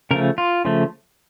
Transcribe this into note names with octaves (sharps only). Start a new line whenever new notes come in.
C#3 F3 A3 A#4
F4
C#3 F3 A3